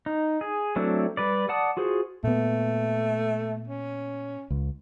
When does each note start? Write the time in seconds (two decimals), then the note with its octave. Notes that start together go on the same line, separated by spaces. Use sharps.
0.06 D#4
0.41 G#4
0.76 F#3 A3 C4 D4 E4
1.17 G3 B4 D5
1.49 D5 F#5 A5 D#6
1.77 F4 F#4 G#4 C5
2.24 A#2 A3 B3
3.67 C#4
4.50 C#2